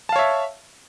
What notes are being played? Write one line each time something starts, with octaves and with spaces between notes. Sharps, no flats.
C#5 E5 F5 A5